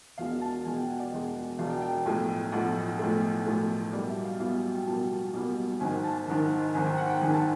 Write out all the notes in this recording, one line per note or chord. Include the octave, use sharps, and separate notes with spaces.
E1 E2 B2 G#3 F5
A5
E1 E2 B2 G#3 G#5
G5
F#5
D5
E1 E2 B2 G#3 D#5
E1 E2 B2 G#3 F5
G5
G5
G5
B1 A2 F3 A3
B1 A2 F3 A3 F#5
B1 A2 F3 A3
B1 A2 F3 A3
B1 B2 G3 A#3 D5
E5
F5
B1 B2 G3 A#3 F5
G5
B1 B2 G3 A#3 A5
B1 B2 G3 A#3
G#1 G#2 D#3 G#5
A5
G#1 G#2 D#3 A5
G#1 G#2 D#3 G#5
G5
F#5
G5
G#1 G#2 D#3 G#5
A5